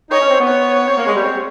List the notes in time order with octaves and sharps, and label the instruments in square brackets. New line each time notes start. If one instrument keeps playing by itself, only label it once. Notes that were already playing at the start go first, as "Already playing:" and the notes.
[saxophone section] D#4 [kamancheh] C#5
[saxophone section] C#4
C4
B3
[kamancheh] C#5
[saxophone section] C4
A#3
G#3
G3
C4